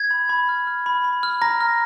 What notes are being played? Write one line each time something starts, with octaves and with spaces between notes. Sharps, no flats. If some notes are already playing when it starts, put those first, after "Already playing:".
Already playing: G#6
B5
B5
F6
F6
B5
B5
F6
A#5 A#6
F6